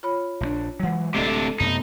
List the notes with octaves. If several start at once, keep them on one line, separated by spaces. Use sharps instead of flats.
F4 C#5 B5
A#1 G3 D4
E3 F#3 G#3 F#5
D1 C3 A3 D4 A4 D#5
F#2 C3 A3 B3 D#4